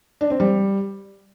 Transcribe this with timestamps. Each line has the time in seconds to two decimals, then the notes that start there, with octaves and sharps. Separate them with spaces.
0.21 D4
0.30 C4
0.40 G3